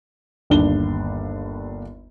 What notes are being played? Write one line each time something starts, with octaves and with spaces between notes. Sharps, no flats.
G1 D#2 D4 G7